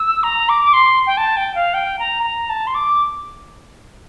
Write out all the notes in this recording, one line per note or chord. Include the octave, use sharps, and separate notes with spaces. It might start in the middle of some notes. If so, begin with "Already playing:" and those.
Already playing: E6
A#5
D6
D6
C6
G5
A5
G5
F5
G5
A#5
A#5
A5
C6
D6